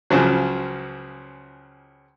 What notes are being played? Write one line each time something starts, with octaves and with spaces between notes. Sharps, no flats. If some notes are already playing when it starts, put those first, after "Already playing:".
C#2 C#3 F3 F#3